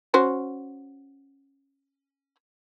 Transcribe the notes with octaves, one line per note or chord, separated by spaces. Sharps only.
C#4 F#4 C5